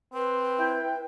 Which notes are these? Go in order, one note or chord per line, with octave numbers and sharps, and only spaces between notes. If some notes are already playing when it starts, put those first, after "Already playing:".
C4 B4
E4 G5